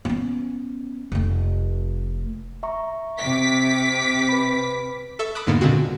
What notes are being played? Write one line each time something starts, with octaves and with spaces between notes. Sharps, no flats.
B3 C#4
F1 A3
E5 A#5 C#6
C3 D6 B6
B4 B5
A4 E5 C#6 E6
B5 D6 D#6 F#6
E2 G#2 D3 A#3 B3
A#2 D3 G#3 C4 F#4